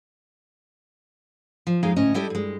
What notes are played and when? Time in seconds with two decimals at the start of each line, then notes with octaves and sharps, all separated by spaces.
1.67 F3
1.83 F2 G#3 D#4 G#4 F5
1.96 D2 A2 C#4 D#5
2.14 G3 E4 G4 A4 D#5
2.30 G2 G#3